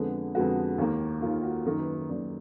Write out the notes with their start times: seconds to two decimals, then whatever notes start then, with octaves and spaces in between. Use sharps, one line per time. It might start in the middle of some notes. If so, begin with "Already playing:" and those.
Already playing: F2 D3 G#3 B3
0.35 F2 D3 G#3 B3 F#4
0.78 D#2 D#3 A#3
1.22 D#2 D#3 A#3 F4
1.43 F#4
1.65 F#2 D#3 A#3 A#4
1.79 B4
1.95 B4
2.09 F#2 D#3 A#3 D5